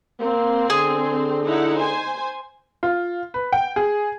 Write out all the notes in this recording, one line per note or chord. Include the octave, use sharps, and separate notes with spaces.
A#3 C4 C6
D3 G#4
D#4 E4 F#5
C5 G#5
F4
B4
G5
G#4